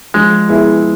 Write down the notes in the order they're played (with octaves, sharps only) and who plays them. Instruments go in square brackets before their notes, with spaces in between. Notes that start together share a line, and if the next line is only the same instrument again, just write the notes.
[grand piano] F3 [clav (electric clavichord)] G#3
[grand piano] B3 E4 G#4